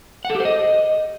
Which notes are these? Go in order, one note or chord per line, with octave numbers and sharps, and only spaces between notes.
F#5
A4
G4
C5
D#5